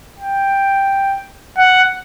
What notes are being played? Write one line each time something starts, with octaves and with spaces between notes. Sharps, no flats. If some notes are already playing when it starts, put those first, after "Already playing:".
G5
F#5